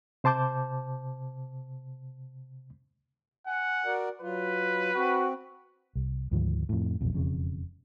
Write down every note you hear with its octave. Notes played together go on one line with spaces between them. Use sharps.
C3 C5 A5 D6 G6
F#5 G#5
F#4 A#4 D5
F#3 F4 B4
C4 F#4
C2
D2 G#2 D#3 F3
F2 A2
E1 B1 F2
E1 F2 C#3